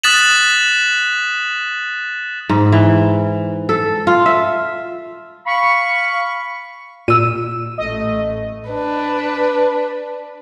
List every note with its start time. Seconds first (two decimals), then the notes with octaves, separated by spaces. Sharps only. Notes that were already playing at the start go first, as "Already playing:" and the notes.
0.03 D#6 F#6 A6 B6 E7 F#7
2.49 G#2
2.72 E3
3.69 A4
4.07 F4
4.26 E5
5.46 F5 B5 C#6
7.08 A#2 E6 D#7
7.78 A1 A3 D#5
8.70 D4 B4